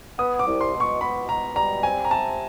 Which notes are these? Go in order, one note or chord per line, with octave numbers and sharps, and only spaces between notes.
B3 D#6
D6
C2
C6
B2
C#6
B2 B5
B2 A#5
G3 A#5
C4 G#5
A#5
C3 A5